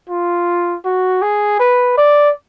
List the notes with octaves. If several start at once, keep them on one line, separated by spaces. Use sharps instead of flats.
F4
F#4
G#4
B4
D5